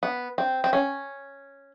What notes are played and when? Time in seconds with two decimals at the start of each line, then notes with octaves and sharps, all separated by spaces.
0.03 B3
0.38 C4
0.64 C4
0.73 C#4